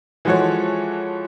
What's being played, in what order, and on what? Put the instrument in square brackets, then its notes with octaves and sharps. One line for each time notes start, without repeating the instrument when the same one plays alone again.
[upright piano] E3 F3 G#3 F#4 A4 C#5